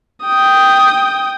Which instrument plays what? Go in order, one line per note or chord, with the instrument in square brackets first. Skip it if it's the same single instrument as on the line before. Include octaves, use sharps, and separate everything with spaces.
[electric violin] G5 D#6